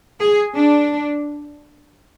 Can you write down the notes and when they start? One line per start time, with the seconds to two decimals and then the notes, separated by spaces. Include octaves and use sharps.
0.20 G#4
0.55 D4